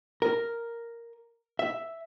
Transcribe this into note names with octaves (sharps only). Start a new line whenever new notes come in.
A#4
E5